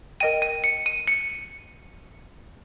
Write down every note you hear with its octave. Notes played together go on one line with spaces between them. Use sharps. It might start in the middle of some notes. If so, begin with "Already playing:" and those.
A#4 D#5 G5 D#7
D#7
C#7
D#7
C#7